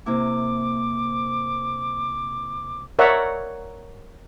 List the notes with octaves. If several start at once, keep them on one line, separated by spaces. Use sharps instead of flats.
C3 A#3 E4 D6
A#4 C#5 D5 E5 F#5 A#5